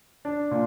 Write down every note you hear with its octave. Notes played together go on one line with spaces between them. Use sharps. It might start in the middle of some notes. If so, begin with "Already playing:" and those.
D4
A#2